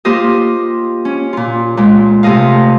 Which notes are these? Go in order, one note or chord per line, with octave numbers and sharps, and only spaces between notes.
A#3 F4 G4 C5 D#5
C#4
A#2 F4
A#2 G#3
C3 A3 D#5 F5